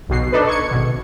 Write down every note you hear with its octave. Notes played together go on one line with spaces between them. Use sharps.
B1 B2 C7
D4 D#4 A4 B4
C#6 G#6 C#7
G#1 B2